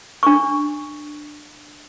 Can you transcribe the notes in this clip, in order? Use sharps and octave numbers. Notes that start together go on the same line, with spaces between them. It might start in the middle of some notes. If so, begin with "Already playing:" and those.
D4 C#6